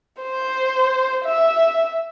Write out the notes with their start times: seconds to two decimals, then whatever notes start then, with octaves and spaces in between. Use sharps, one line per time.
0.22 C5
1.25 E5